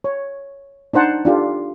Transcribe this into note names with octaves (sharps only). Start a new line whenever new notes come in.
C#5
D4 D#4 C5 F#5 A5
D4 F4 G4 A4